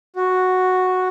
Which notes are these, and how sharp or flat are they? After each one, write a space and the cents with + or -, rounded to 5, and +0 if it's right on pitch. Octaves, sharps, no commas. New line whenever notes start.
F#4 -5